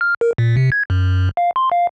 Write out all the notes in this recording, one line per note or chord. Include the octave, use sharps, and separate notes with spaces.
F6
A#4
A#2
C3
G#6
F#2
F5
C6
F5